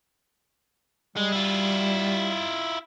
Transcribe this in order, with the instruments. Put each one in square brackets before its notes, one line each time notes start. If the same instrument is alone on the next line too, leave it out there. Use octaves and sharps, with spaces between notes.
[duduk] G3 [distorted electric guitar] G#3
[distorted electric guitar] E4 F4